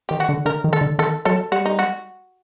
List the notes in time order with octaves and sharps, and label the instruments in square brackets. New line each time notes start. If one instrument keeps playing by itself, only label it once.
[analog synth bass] D#3 [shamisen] G4
[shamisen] F#4
[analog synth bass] D3
[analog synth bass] D3 [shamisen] A#4
[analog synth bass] D#3
[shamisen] A4
[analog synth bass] D3
[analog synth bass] D#3 [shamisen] A4
[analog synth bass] F#3 [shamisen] A4
[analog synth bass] G3 [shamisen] F#4
[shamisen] D#4
F#4